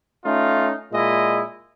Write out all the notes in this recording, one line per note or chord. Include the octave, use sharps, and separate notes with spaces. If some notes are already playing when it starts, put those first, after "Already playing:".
A3 C#4 D#4 F4
A#2 G#3 E4 D#5